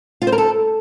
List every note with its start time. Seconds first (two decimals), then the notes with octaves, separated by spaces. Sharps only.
0.22 F4
0.27 C5
0.32 A#4
0.38 A4